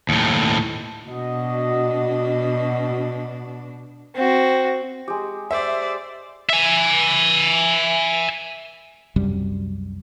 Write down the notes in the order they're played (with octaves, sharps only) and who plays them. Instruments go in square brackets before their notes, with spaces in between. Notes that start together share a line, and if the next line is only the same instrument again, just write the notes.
[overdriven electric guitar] D#2 A2
[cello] B2 D4 [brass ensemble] F#4 D#5
[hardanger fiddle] C4 F#4
[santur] G#3 G4
[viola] C5 D5 [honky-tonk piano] E5
[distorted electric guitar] E5 G#5
[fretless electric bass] C2 F#2 C3 G3